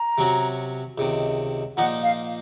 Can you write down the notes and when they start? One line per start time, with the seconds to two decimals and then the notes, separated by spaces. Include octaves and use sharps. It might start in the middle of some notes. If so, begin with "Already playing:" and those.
Already playing: A#5
0.18 C3 F#3 C#4 F#4
0.98 C#2 C3 D#3
1.77 A#2 F3 A#3 D#4 F#5
2.03 F5